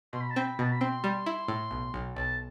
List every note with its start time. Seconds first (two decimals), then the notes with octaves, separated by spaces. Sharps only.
0.13 B2 C6
0.21 B5
0.30 A5
0.36 C4 B5
0.59 B2 A5
0.71 B5
0.81 C4 C6
1.04 G3
1.26 E4
1.48 A2
1.71 B1
1.94 B1
2.16 B1 A5